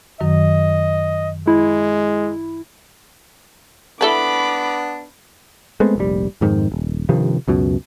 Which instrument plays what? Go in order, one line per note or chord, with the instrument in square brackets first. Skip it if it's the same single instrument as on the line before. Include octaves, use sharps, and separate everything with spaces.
[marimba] F#2 D#3 F#3 [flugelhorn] D#5
[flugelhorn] G#3 [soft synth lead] E4
[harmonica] B3 D4 [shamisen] E4 A4 B4 [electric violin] B5 D6
[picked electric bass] G#3 A3 B3 C4
F1 A#1 G3
F2 G#2 D#3
D#1
G2 C3 D#3 F3
C#2 F#2 B2